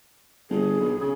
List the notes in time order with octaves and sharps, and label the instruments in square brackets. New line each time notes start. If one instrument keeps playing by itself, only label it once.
[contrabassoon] G1 [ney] G#4
[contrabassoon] B1
C#3